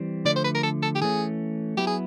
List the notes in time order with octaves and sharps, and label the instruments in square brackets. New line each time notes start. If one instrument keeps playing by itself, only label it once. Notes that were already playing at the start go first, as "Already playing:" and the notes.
Already playing: [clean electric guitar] E3 G3 C4
[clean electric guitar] D3 F3 A3 [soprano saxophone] D5
[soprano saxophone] C5
B4
A#4
A4
A4
G4
[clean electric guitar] E3 A3 C#4 [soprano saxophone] G#4
[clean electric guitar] F#3 B3 E4 [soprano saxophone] G4
[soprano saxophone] G#4